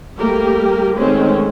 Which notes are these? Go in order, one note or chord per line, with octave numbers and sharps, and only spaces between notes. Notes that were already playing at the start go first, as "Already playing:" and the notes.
G3 A3 A#3 G4 A#4
D#3 G#3 A3 C4 C#4